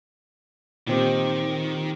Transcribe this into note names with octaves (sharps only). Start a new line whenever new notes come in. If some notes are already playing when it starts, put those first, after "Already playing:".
A#2 D#3 C4 G4